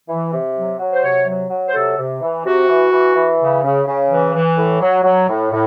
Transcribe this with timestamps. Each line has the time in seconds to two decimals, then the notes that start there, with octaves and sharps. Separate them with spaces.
0.08 E3
0.32 C3
0.56 F#3
0.79 F#3
0.92 C5
1.03 C3 C#5
1.27 F#3
1.50 F#3
1.68 C5
1.74 C3 A4
1.98 C3
2.21 E3
2.45 C3 F#4
2.69 E3
2.91 E3
3.15 E3
3.39 C#3
3.63 C#3
3.86 C#3
4.10 E3
4.33 E3
4.57 A2
4.81 F#3
5.04 F#3
5.28 A2
5.52 A2